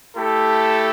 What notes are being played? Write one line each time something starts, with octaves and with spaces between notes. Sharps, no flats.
A3 E4 G4 A4